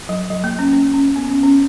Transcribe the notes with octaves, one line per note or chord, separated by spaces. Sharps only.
F#3
F#3
A#3
C#4
C#4
C#4
B3
C#4
C#4